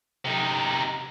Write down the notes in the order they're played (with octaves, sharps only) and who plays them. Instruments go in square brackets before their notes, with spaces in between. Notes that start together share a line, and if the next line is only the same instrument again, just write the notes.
[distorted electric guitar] C3 D#4